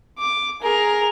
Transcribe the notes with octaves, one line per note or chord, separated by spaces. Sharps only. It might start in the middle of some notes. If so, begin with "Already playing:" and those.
D6
G#4 A#4